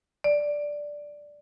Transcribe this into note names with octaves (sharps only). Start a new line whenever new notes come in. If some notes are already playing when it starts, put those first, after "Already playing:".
D5